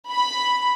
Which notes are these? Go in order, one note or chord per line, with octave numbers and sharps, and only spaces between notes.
B5